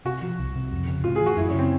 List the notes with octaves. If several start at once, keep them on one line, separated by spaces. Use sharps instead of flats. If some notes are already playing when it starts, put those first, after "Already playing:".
C3 F#4
F3
C2
C3
F2
C#3
A2 F4
G#4
E3
F#4
F#2 E4
C#4
C#3 C4